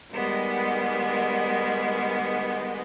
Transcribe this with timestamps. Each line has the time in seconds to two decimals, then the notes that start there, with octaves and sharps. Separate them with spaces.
0.11 D#3 G3 G#3 B3